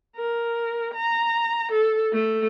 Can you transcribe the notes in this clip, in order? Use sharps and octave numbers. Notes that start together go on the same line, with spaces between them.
A#4
A#5
A4
A3